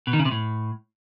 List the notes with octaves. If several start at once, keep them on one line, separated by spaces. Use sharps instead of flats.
B2
D#3
C#3
C3
A2